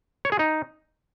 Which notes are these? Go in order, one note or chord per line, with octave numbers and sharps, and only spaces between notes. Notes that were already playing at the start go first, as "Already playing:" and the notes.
C#5
G#4
D#4